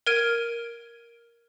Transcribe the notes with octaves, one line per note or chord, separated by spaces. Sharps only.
A#4 F6 G#6 D7 D#7